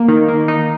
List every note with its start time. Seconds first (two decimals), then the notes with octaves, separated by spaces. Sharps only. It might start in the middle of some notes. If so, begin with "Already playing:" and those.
Already playing: A#3
0.08 D#3
0.28 A#3
0.48 D#4